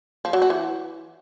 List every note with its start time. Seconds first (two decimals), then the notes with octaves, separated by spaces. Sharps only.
0.25 F3
0.33 F#3
0.42 F#4
0.50 E3